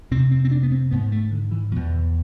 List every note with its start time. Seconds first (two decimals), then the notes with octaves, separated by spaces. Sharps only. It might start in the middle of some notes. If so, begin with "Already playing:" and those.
0.11 F2 C3 C4
0.31 C4
0.45 C4
0.51 D4
0.63 B3
0.72 C4
0.91 G#2 B3
1.12 A3
1.31 D3
1.51 E3
1.72 B2 F3
1.76 E2
1.92 E3